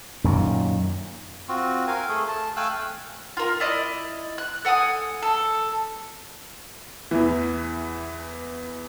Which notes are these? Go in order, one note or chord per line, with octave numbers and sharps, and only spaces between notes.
F#2 A#2 D#3
C4 F4 F#4
A#4 F5 G#5
A3 G#4 A4
A5
A3 F5 G5 G#5 E6 F#6
F4 A#4
E4 D5 D#5
F#6
A4 F#5 G#5 D#6
A4
E2 E3